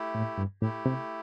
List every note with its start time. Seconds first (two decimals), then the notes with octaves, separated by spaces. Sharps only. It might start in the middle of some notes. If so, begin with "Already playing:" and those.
Already playing: A3 E4 G4
0.15 A2
0.38 G2
0.62 A2 A3 E4 G4
0.86 C3